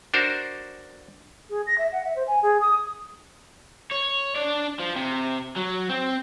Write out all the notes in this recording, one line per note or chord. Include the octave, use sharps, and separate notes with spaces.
D4 F#4 A#4 C5
G#4
A#6
E5
F#5
E5
C5
G#5
G#4
D#6
C#5
D4 D5
F3
C3
F#3
C4